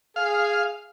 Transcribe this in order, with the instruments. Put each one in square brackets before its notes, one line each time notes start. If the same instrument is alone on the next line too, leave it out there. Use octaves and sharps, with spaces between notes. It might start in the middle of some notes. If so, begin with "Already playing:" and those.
[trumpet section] G#4 [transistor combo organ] F5